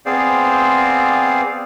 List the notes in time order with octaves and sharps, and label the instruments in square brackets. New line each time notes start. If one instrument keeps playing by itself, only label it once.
[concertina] B3 C4 G#4 C5 D5 F5